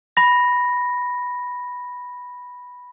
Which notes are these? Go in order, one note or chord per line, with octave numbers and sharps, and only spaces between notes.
B5 A#6